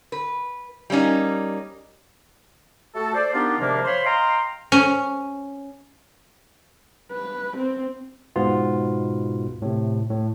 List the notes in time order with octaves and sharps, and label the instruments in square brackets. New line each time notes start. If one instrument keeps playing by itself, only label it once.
[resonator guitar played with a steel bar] B4
G3 A#3 C#4 D#4
[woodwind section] A3 F#4 A4
A4 C5 D5
A#3 B3 D4 D#4 F4 G4
G#2 C3 D#3 F3 A#3 D4
C5 C#5 F5 B5 C6
D#5 F5 G5 A#5 C6
[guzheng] C#4
[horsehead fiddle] B4
C4
[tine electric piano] G#2 B2 B3 F4
A2 C3
A2